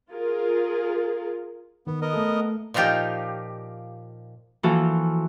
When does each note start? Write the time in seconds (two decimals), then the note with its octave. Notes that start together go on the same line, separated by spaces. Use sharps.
0.12 F4 G#4 A#4
1.87 D#3 B3
2.02 B3 A#4 D#5
2.13 A3 A4
2.74 A#2 F3 D#4 F4 G4
4.63 E3 F3 A#3 F4 F#4 A4